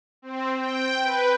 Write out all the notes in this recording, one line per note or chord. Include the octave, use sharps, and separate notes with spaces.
C4
G5
B4